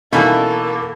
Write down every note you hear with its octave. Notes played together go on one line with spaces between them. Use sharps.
B2 E3 A#3 C#4 D#4 A4 B5